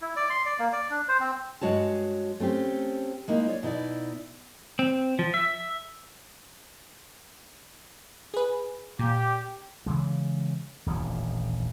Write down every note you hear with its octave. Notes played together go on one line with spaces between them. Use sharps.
E4
D5
C6
D5
A#3
D5
D4
C5
C4
G2 E3 G#3 F#4 C#5 A5
A3 C4 C#4 G4
G#3 A#3 D#4 E4
C#5 D5
B2 D#4 E4 D5
C4
F3
E5
G#4 B4
A#2 G4
C#3 E3 G#3
D#1 A1 F2 D3